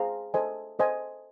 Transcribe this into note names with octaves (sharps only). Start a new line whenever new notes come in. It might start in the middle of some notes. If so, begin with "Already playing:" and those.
Already playing: G#4 C5 F5 A#5
A4 C5 D#5 G#5
A4 C5 D#5 G#5